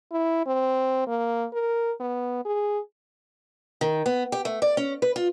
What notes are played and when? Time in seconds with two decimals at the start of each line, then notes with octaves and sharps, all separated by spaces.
0.12 E4
0.47 C4
1.07 A#3
1.53 A#4
2.00 B3
2.45 G#4
3.81 D#3
4.06 B3
4.32 G4
4.45 A3
4.62 D5
4.77 C#4
5.02 B4
5.16 F4